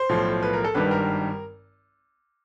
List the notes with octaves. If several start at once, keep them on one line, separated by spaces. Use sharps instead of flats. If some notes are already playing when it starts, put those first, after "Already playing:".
Already playing: C5
B1 A2 F3
B4
A#4
A4
G#1 G2 D#3 G3 B4
A#4